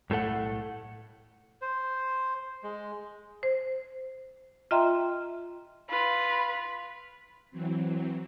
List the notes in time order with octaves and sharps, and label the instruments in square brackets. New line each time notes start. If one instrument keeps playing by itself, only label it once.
[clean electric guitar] B1 A2 A3 A4 F#5
[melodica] C5
G#3
[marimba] C5
F4 D#5 E5 G5 A#5 C6
[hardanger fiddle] F4 [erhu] B4
[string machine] E3 F#3 C4